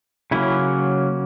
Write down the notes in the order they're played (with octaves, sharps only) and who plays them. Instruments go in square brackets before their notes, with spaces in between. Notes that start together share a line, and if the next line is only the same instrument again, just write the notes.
[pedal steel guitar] C#3 F#3 A#3 C#4 E4